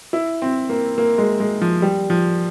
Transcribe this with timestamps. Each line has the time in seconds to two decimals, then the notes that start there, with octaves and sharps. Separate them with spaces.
0.13 E4
0.42 C4
0.69 A#3
0.98 A#3
1.18 G#3
1.40 G#3
1.62 F3
1.82 G3
2.10 F3